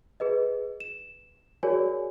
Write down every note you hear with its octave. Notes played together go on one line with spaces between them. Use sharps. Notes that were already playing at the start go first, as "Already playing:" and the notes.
G#4 B4 D#5
E7
F#4 G#4 A#4 C#5 D5 G#5